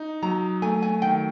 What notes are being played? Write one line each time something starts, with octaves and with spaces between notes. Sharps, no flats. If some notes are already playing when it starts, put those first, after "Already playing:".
Already playing: D#4
F#3 A#5
A3 G#5
G#5
D#3 G5